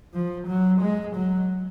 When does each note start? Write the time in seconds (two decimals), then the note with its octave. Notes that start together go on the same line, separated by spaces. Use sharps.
0.14 F3
0.47 F#3
0.81 G#3
1.16 F#3